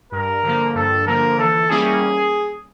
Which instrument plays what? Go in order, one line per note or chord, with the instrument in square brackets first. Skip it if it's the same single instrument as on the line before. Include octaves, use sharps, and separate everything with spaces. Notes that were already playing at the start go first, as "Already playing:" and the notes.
[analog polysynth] G2 [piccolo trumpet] A#4
[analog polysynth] D3 F3 A#3
[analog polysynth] G2 [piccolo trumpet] A4
[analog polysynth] D3 F3 A#3 [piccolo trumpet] A#4
[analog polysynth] E3 [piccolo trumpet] A4
[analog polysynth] G3 A#3 C#4 E4 [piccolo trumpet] G#4